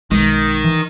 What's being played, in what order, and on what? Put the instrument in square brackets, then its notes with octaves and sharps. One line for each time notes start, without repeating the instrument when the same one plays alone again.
[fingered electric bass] B1 G#3 [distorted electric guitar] D#3
[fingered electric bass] E3